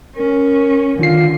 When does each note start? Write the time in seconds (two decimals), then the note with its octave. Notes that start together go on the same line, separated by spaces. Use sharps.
0.16 C#4 A#4
0.99 D3 D#3 F4 C7